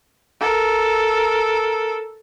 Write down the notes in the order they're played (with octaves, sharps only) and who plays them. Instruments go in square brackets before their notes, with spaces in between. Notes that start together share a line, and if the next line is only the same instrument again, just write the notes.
[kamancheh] A4 A#4